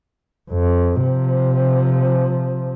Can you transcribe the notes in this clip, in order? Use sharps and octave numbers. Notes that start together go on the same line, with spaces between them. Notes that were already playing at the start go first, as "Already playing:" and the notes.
F2
C3 F3